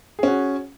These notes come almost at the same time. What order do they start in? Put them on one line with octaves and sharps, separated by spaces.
G#4 C#4 F#4